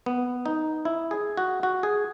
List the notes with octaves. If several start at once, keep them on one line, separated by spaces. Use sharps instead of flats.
B3
D#4
E4
G#4
F#4
F#4
G#4